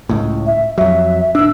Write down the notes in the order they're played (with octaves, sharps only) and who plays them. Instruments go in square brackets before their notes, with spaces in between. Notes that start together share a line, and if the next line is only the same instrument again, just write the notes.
[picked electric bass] C#2 A2
[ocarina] E5
[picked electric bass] F2 F#3 [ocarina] E5
[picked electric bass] D#1 D4 [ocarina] E6